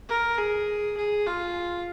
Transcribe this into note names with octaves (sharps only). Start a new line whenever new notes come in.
A#4
G#4
G#4
F4